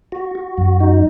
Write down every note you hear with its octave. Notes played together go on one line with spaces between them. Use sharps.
F#4
F#4
F#2
D#4